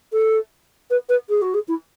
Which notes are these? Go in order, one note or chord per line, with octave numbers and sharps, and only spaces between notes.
A4
B4
B4
G#4
F#4
G#4
E4